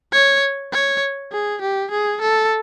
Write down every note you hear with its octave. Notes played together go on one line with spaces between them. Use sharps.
C#5
C#5
G#4
G4
G#4
A4